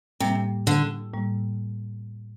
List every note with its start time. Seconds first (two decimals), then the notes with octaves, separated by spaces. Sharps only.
0.20 A2 C3 G3 A#3
0.67 D3
1.14 A2 G3 A#3